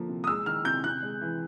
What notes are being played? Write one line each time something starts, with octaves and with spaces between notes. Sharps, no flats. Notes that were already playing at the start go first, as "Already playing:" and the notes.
Already playing: D3 F3 A#3
C3
D#6
G#3 E6
D#3 F6
C3 G6
C3 F#6
G#3
E3